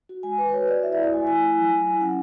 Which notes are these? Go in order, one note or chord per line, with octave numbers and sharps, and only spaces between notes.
F#4
G#3 G#5
F#4 B4
B4
F#4 C#5
F#4 D5
E4 E5
D5
E4
D5
A3 G#5
E4 G#5
E4
F#3
F#3
E4
C#4 F#5